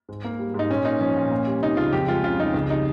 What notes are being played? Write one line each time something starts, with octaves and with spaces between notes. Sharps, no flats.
G#2
A#3
G3
G#2
D#4
A#2 C#4
A#3 D#4
F3 C#4
A#2
A#3
G3
C3 D#4
C#2 F4
F2 G4
G#3 F4
C#3 F4
F2 D#4
C#2
G3 D#4